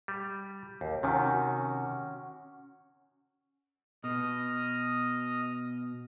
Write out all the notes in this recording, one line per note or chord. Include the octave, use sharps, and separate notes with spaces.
G3
D#2
C3 D#3 C#4 F#4
B2 D#5 D#6 F6